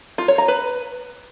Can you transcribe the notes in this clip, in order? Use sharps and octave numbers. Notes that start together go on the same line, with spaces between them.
F4
C#5
A#5
B4